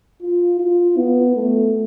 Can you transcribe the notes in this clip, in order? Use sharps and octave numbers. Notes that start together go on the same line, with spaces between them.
F4
F4
B3
A3